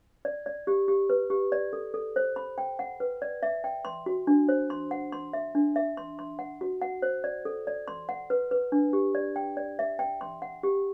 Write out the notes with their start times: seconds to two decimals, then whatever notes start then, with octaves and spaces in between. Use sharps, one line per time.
0.25 D5
0.46 D5
0.67 G4
0.88 G4
1.10 B4
1.30 G4
1.52 D5
1.73 A4
1.94 A4
2.16 C5
2.36 B5
2.58 G5
2.79 F#5
3.00 B4
3.22 D5
3.43 E5
3.64 G5
3.85 C6
4.06 F#4
4.27 D4
4.49 C5
4.70 C6
4.91 F#5
5.12 C6
5.33 E5
5.55 D4
5.76 E5
5.97 C6
6.19 C6
6.39 F#5
6.61 F#4
6.82 F#5
7.02 C5
7.24 D5
7.45 A4
7.67 D5
7.88 C6
8.09 F#5
8.30 B4
8.51 B4
8.72 D4
8.93 G4
9.15 D5
9.36 G5
9.57 D5
9.79 E5
9.99 G5
10.21 C6
10.42 F#5
10.63 G4